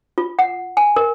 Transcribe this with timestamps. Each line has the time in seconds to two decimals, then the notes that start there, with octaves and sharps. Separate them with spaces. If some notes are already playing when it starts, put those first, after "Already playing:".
0.18 F4
0.39 F#5
0.77 G#5
0.96 A#4